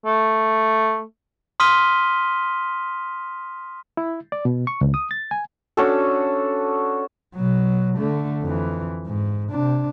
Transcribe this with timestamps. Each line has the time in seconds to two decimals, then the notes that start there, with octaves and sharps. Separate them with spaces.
0.05 A3
1.60 C6 D#6 F6 B6 D#7 G7
3.97 E4
4.32 D5
4.45 B2
4.67 C#6
4.81 C#2
4.94 D#6
5.11 A6
5.31 G#5
5.77 C#4 D4 F#4 A4
7.35 B2 F#3
7.97 D3 A3
8.43 F2 E3
9.07 G#2
9.51 C3 D4